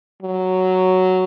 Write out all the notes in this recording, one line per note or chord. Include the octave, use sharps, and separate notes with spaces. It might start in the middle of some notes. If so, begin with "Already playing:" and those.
F#3